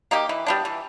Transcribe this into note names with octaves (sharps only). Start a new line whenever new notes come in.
A#3 D#4 G4
E3
G3 B3 D4
E3